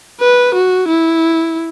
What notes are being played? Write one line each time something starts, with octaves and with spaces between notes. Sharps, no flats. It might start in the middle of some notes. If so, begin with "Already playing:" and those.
B4
F#4
E4